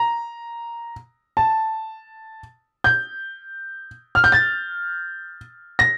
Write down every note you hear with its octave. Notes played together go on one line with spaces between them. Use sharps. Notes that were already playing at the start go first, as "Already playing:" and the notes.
Already playing: A#5
A5
G6
F6
G6
A6
A#6